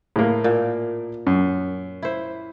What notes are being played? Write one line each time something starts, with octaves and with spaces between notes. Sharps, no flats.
A2 A#3
A#2
F#2
E4 C5